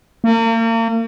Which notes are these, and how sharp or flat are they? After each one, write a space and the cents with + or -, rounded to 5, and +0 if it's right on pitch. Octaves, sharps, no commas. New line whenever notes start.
A#3 -40